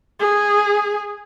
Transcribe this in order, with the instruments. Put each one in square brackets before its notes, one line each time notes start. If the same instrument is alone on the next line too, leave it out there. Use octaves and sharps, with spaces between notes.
[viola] G#4